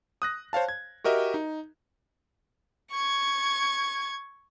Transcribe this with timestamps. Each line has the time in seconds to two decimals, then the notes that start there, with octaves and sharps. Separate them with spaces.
0.22 D#6 F#6 A#6
0.53 C5 C#5 F5 A5
0.69 G#6
1.04 F#4 G4 A#4 D#5 E5
1.34 D#4
2.91 C#6 G#6